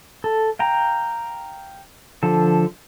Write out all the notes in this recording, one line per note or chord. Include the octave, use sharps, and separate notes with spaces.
A4
F5 G5 A#5
D3 F3 A4